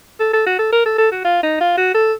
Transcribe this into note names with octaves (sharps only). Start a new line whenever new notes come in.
A4
A4
F#4
A4
A#4
A4
A4
F#4
F4
D#4
F4
F#4
A4